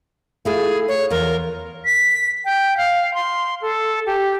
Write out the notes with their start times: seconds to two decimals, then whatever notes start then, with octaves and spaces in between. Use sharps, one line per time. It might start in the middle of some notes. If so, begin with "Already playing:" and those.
0.45 A3 E4 F4 G#4
0.88 C#5
1.10 E2 F4 A#4
1.85 B6
2.45 G5
2.77 F5
3.14 C6
3.61 A4
4.06 G4